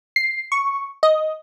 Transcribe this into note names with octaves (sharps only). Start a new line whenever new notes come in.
C7
C#6
D#5